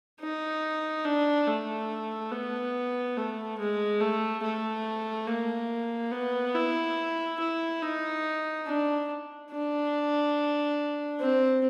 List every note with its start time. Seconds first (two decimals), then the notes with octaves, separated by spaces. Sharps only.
0.20 D#4
1.04 D4
1.47 A3
2.32 B3
3.17 A3
3.58 G#3
4.01 A3
4.43 A3
5.28 A#3
6.12 B3
6.55 E4
7.40 E4
7.82 D#4
8.66 D4
9.51 D4
11.19 C4